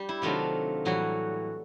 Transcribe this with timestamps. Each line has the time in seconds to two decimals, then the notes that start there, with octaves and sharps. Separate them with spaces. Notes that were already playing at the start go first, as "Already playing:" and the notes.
Already playing: G3 G4
0.09 E4
0.22 C3 D#3 F#3 A3 D4 F4
0.85 A2 E3 F#3 G3 F#4